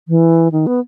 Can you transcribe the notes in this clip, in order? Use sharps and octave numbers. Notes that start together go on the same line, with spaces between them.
E3
D#3
B3